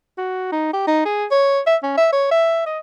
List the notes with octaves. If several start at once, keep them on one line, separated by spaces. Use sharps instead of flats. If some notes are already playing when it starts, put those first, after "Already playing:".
F#4
D#4
G4
D#4
G#4
C#5
E5
C#4
E5
C#5
E5
D#5